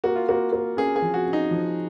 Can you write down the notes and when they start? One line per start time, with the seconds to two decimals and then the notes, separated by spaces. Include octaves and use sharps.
0.04 A#3 F#4
0.16 F4
0.29 A#3 F#4
0.53 A#3
0.77 C#4 G#4
0.96 G#4
1.02 F3
1.14 F#4
1.27 C#4
1.33 D#4
1.51 F3